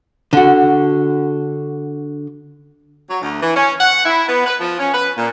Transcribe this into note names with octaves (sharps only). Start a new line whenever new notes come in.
D3 F#4
F#3
D2
E3
C#4
F#5
E4
B3
B4
F3
C#4
B4
A#2